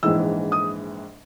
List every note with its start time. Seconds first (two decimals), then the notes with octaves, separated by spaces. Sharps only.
0.03 A#1 G#2 E3 E6
0.52 D#6